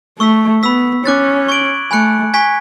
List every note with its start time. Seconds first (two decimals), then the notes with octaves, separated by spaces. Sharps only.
0.19 A3 C#6 E6 B6
0.63 B3 B5 E6 B6
1.05 C#4 D6 F#6 A6
1.48 C#6 G#6 D7 F#7
1.91 A3 G#5 B5 F#6 C#7
2.34 G#5 C#6 G#6 B6